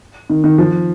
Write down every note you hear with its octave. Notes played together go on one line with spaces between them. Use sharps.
D#3
D#3
F3